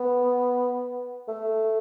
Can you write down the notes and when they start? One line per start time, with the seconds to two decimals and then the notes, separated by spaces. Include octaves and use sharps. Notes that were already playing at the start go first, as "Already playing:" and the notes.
Already playing: B3
1.28 A3